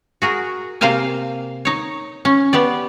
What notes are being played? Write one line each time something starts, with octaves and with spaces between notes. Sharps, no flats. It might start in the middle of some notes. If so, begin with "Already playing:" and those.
F#4 G#4 A#4
C3 A#3 C5 F5 G5 G#5
D#4 C#5
C#4
B3 G4 D5